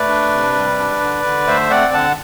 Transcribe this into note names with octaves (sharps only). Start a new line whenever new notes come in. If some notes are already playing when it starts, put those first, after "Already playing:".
Already playing: A3 B4 D5
D4
C3
G3
D4
D3
D3
A3 C5 E5
C4 D5 F#5
D3 F#5 A5